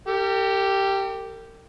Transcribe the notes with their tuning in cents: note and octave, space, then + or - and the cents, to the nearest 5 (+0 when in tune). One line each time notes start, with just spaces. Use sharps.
G4 +0 A#4 -45